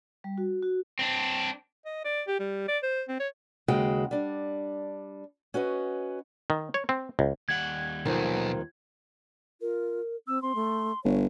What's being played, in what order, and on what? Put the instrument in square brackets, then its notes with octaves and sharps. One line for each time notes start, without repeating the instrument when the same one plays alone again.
[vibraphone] G3
F#4
F#4
[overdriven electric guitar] C4 D4
[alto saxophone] D#5
D5
G4
G3
D5
C5
C4
C#5
[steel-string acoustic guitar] D#2 C#3 G#3 F#4 G5
G3 D4
C#4 F#4 B4 D#5
[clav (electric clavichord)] D#3
C#5
C4
C#2
[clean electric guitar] D#2 G3 F#5 [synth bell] G#6
[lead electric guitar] B1 [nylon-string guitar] D#3 F3
[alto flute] F4 [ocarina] A#4
[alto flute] C4 [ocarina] E6
[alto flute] C4 [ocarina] C6
[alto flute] A3
[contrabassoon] G1 [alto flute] C#5